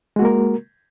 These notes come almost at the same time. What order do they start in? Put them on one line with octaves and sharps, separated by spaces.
G#3 F#4 A#3 A#4